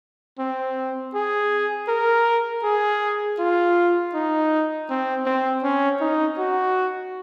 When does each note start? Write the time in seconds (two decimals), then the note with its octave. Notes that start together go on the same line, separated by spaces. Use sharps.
0.39 C4
1.14 G#4
1.88 A#4
2.63 G#4
3.39 F4
4.14 D#4
4.89 C4
5.26 C4
5.63 C#4
6.01 D#4
6.38 F#4